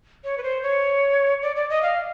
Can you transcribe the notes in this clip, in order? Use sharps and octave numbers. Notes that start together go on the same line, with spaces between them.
C#5
B4
C5
C#5
D5
D5
D#5
F5